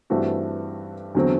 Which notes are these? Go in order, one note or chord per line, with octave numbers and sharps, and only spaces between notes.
G2 E3 A3 C4 F#4
E2 D3 F#3 C4